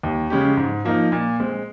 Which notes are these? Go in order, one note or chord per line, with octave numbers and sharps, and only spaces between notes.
D#2
C#3 G#3 C#4 G4
G#2
F3 A#3 D#4
A#2
G#3 C4